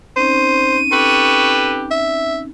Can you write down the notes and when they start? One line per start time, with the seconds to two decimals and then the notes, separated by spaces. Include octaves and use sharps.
0.16 C4 C#4 D#4 C5 D#7
0.92 G4 A4 B4 C#6
1.91 E5